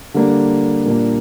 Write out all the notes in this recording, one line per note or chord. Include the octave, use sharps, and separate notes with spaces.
D3 G3 A#3 D4
A#2 G3 A#3 D4